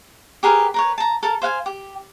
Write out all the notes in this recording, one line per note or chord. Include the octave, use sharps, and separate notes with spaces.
G4 G#4 A#4 B4
A#4 B4 C#5
A5 A#5
A4 A#4 A5
C5 F5 F#5 G#5
G4